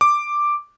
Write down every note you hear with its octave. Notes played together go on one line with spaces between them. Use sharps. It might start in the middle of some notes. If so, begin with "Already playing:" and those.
D6